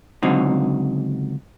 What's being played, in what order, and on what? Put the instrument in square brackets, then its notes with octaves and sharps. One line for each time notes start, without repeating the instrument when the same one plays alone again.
[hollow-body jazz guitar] C#2 D3 F#3 C4 D#4